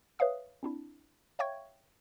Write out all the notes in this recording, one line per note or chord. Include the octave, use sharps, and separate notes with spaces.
B4 C#5 E5 F5 D#6
C4 D4 E4
C#5 E5 F5 G5 C#6 G#6